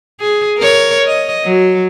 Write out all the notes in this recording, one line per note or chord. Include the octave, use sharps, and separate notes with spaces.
G#4
A#4 C#5
D#5
F#3